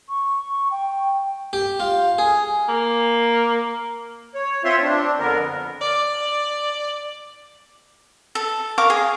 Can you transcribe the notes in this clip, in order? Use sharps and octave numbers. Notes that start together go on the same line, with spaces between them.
C#6
C#6
G5
G4
F4
G#4
A#3
C#5
C4 F4 C5 C#5 E5 C6
C4 D4
F2 D3 B3 A#4
D5
A4
A#4 F5 C#6 D6
G#4